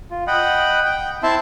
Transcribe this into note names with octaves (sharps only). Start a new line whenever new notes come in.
F4
D#5 F#5 G5 B5
G5
C4 E4 E5 A5 C6